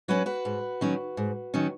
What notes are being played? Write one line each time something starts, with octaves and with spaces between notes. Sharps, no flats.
F#3 C#4 F#4 B4
F#4 B4
G#2
D#3 F#3 C#4
G#2
D#3 F#3 C#4